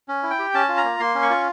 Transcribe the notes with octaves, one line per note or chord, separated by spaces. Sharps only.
C#4
E4
G5
G4
C#4 A5
F4
A#5
A#3
A#3 C6
C#4
C#6
F4